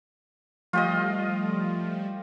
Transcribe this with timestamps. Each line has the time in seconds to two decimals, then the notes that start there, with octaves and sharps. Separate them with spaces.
0.73 F3 G3 A3 F4 G4 D#5